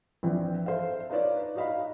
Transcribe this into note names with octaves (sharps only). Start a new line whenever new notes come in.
A#1 E3 C4 G5
A4 C5 E5 F5
D4 D#4 F4 B4 C#5 D5
D#4 F#4 D#5 F5 B5